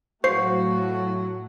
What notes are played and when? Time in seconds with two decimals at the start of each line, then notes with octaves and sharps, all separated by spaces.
0.24 A2 F#3 A3 F#4 C5 F5 C#6 C7